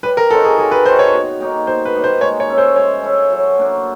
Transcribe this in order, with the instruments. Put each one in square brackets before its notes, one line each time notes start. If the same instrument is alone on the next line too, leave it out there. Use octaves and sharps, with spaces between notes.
[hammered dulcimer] G3 [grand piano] B4
[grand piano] A#4
[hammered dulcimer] C4 D#4 F#4 [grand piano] A4
[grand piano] G#4
[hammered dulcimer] G3 [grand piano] G#4
[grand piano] B4
[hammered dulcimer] C4 D#4 F#4 [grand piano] C5
[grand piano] C#5
[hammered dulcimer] B2
G3 A#3 D#4
[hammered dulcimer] B2 [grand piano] C5
[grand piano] B4
[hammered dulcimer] G3 A#3 D#4
[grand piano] C5
[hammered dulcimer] G#3 [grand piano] C#5
[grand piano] C#5
[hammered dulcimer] C#4 E4 A4
[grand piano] C5
[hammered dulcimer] G#3 [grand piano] C#5
[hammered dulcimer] C#4 E4 A4
F#3
A#3 D4 F#4